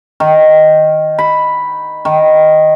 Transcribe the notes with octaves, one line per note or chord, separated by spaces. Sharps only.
D#3
B5
D#3